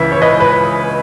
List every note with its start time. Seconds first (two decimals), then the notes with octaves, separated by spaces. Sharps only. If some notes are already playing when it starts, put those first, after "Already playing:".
Already playing: C#2 C#3 E3 B4 E5
0.12 C#5
0.22 B4 D#5
0.40 B4